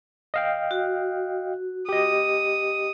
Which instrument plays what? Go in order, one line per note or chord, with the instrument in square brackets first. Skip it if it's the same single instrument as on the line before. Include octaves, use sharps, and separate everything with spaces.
[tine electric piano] D#5 F5 G5
[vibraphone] F#4
[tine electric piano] G4 D#5 [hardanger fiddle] D#6